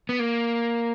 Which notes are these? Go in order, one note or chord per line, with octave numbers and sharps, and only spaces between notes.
B3
A#3